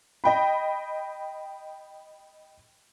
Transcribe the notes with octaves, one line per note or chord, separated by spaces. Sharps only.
D#5 G5 B5